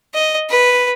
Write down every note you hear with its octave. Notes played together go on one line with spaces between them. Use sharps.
D#5
B4